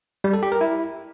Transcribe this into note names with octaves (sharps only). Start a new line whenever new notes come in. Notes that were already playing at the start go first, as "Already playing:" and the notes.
G3
A4
G4
A#4
E4